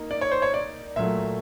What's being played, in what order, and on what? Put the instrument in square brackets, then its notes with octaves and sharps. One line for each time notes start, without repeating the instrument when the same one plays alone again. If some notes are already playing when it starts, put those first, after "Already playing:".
Already playing: [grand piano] A#3 D#4
D5
C#5
C5
C#5
D5
A#2 F#3 A3 E5